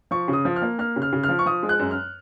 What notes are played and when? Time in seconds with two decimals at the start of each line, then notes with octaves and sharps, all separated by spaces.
0.11 F3 C#6
0.28 C#3
0.33 D#6
0.45 F3
0.56 F6
0.62 A#3
0.79 A#3 F6
0.96 C#3
1.02 F6
1.13 C#3
1.24 F6
1.29 F3
1.39 C#6
1.46 F3 D#6
1.63 G#3
1.69 F#6
1.79 F#2
1.91 F6